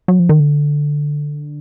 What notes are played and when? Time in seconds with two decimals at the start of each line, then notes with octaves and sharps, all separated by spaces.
0.08 F#3
0.19 F3
0.29 D#3
0.40 D3